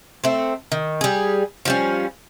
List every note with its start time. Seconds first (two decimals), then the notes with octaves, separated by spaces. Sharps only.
0.24 A3 C4
0.72 D#3
1.01 G3 G#4
1.65 F3 G3 C#4